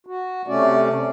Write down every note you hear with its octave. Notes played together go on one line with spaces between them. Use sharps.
F#4
C3 A3 C#4 D5